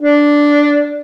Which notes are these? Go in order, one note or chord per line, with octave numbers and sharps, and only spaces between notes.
D4